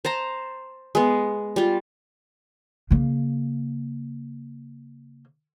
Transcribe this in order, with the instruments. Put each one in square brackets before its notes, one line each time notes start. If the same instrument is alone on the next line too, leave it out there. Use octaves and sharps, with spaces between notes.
[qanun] C5 A5 A#5
G#3 B3
G3 F4
[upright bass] C#3 A#3